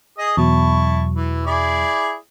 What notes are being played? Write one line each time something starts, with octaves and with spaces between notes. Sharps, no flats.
G#4 D#5 D#6
E2 B2 F#3 E4 A5 C#6
E3
E4 G#4 D5